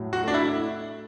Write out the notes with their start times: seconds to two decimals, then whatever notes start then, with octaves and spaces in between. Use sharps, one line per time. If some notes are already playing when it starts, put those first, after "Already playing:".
Already playing: A2 F#3
0.13 F#4
0.24 A3 D4
0.34 E4